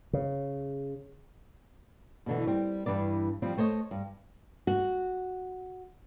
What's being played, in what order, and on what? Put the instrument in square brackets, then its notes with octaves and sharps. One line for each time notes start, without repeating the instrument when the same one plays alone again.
[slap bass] C#3
[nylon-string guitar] B2 D3 E3
G3 C4
G2 E3 D4 D5
F3 G3 C4
A3 C5 C#5 D#5
G2
F#4